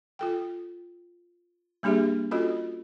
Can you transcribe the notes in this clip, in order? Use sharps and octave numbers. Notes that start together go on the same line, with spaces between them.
F4 A4 G5
G3 A#3 D4 G4 G#4 E5
C#4 F4 F#4 A4 D#5